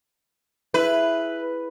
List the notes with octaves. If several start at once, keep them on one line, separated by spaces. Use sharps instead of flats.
E4 G#4 B4 E5